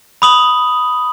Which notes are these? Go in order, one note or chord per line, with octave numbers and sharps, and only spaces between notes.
B5 D#6 F#7